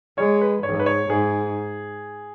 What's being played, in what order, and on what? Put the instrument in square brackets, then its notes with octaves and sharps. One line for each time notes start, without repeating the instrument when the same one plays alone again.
[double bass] G#3 [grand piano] C#5
[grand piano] B4
[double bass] G#2 [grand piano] C#5
[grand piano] B4
C#5
[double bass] G#2 [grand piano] G#4